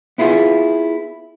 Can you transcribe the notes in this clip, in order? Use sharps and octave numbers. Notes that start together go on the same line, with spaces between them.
B3 E4 F4 G#4